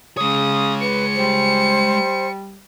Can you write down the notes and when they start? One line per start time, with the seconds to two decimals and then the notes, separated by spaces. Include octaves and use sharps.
0.17 C#3 G#3 C#5 D#6
0.81 B4 C#7
1.15 G3 C5